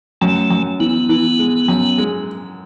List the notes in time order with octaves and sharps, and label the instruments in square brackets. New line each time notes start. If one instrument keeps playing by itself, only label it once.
[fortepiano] F#2 [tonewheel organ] A3
[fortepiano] F#2
[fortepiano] E3 [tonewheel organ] B3
[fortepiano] E3
G#3
F#2
G#3